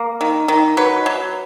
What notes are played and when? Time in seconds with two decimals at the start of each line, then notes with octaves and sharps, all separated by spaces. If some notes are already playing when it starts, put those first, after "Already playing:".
Already playing: A#3
0.21 D#3
0.48 D#3
0.77 F#3 B4
1.06 F#3